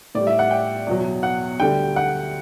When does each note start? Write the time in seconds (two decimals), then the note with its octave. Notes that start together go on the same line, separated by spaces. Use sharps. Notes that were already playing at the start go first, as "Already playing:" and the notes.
0.15 A2 G3 D5
0.27 E5
0.39 F#5
0.51 G5
0.86 E2 B2 F#3
1.23 F#5
1.60 D2 D3 G3 G5
1.96 F#5